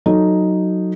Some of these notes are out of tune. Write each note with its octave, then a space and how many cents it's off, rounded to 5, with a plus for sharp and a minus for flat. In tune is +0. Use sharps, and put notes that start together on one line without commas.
F#3 +0 D#4 +0 A4 +0